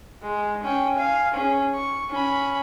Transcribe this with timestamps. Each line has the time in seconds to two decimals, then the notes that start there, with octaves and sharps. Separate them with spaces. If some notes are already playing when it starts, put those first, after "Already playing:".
0.23 G#3
0.64 C#4 G5
0.96 F5 G#5
1.34 C#4 G#4
1.75 C#6
2.11 C#4 B5